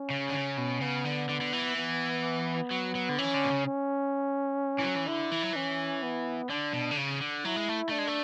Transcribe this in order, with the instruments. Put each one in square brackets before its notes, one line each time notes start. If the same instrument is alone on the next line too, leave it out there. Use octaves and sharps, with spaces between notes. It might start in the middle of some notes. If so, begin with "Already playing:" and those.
Already playing: [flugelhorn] C#4
[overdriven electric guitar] C#3
D3
C#3
B2
[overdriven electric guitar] C#3 [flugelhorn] B3
[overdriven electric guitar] D3
D3
D3
E3
[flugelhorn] B3
[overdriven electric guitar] F#3
F#3
D3
[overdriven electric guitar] E3 [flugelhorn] C#4
[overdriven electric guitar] D3
B2
C#3
[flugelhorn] C#4
[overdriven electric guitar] E3
F#3
E3
[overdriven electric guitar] D3 [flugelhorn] E4
[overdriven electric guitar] E3
F#3
[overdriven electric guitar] E3 [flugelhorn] C#4
[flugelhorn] B3
[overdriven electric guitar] D3 [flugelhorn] D4
[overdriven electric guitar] B2
D3
C#3
D3
[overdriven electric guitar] F#3 [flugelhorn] E4
[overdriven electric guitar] G#3
A3
[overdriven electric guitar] A3 [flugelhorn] D4
[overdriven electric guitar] G#3
A3